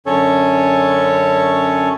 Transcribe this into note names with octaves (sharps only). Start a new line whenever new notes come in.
F#2 D3 C#4 A4 C#5